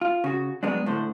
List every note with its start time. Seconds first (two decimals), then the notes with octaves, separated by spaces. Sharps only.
0.01 F4
0.24 C#3 F#4
0.63 F#3 G#3 B3 C4 D4
0.86 A2 D3 C5